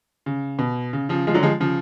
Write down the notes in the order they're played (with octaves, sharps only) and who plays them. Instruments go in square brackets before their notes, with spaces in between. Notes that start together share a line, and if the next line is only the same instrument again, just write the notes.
[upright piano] C#3
B2
C#3
C#3 F3
F3 G#3
D3 F#3
F3 G#3
C#3 F3